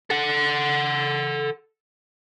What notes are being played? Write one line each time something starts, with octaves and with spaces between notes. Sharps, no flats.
A4 F#5